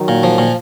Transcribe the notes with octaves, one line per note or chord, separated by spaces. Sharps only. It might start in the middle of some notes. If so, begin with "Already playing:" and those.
Already playing: D#3 F#3
A#2
F3
A#2